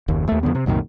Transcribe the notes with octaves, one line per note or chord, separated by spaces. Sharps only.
F#1 D#2
D#2 A3
F2 D3 B3
C3
C2 F#2 A#2 D#3